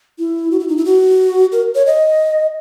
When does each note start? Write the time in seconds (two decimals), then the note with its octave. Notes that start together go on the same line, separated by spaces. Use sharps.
0.19 E4
0.51 F#4
0.60 E4
0.68 D#4
0.77 E4
0.85 F#4
1.52 A#4
1.75 C#5
1.86 D#5